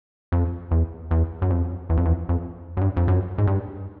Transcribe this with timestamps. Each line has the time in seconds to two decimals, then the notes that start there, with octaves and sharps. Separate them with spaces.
0.32 F2
0.71 E2
1.11 E2
1.42 F#2
1.50 F2
1.90 E2
1.97 F2
2.05 E2
2.29 F2
2.77 F#2
2.81 G2
2.97 F2
3.08 F#2
3.38 G#2
3.47 G2